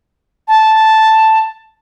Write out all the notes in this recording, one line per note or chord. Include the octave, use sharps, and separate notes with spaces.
A5